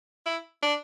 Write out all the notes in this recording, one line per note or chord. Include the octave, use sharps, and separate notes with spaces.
E4
D4